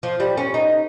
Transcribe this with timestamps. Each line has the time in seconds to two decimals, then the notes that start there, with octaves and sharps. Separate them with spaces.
0.03 F3
0.20 G3
0.37 C#4
0.54 D#4